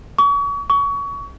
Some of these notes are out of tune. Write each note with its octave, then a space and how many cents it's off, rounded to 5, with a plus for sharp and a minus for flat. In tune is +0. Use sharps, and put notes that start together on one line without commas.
C#6 +35
C#6 +25